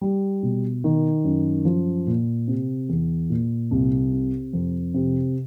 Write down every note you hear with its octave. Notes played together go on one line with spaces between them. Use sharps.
G3
B2
D#3
F#2
F3
A#2
C3
E2
A#2
C2
C3
F2
C3